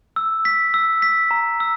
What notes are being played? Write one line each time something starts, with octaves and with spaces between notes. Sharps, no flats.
E6
B6
E6
B6
A#5
E6